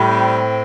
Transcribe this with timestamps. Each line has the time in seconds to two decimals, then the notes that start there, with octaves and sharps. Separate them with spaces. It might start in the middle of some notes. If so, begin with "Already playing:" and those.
Already playing: A2 G3
0.09 C4